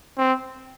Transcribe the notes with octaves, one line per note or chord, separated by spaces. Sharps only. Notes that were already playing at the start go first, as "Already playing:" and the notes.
C4